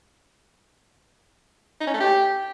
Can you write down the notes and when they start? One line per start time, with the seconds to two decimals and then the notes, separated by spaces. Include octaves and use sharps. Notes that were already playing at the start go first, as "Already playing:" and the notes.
1.81 D#4
1.87 C#4
1.94 A3
2.01 G4